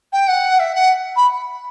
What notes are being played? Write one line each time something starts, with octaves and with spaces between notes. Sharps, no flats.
G5
F#5
E5
F#5
B5